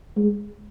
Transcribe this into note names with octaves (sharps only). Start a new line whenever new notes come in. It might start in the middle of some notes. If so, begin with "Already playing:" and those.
G#3